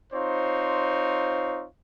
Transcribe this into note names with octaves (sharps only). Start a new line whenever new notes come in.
C4 D#4 F4 C5 C#5